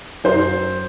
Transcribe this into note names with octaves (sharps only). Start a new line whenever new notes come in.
F#2 C5